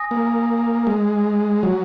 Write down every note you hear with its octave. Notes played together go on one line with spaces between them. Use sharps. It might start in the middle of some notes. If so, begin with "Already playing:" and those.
Already playing: G#5 D#6 A#6
A#3
G#3
F#3